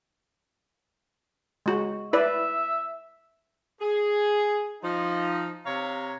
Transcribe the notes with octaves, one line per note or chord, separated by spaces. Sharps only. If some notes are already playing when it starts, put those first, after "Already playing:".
G#3 F#4
E4 B4 D5 E5
G#4
F3 D#4
C3 C#5 F5 A#5